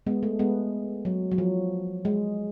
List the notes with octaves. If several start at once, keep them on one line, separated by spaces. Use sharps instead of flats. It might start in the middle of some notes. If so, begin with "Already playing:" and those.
G#3 B3
A3
G#3 B3
F#3
F#3
F3
G#3